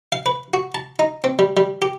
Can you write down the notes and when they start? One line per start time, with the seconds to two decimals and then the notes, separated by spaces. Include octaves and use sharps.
0.12 F5
0.26 B4
0.54 F#4
0.75 A5
0.99 D#4
1.24 C4
1.39 G3
1.57 G3
1.82 G4